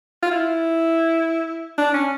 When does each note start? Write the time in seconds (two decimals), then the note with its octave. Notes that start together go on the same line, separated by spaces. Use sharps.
0.23 F4
0.31 E4
1.78 D4
1.94 C#4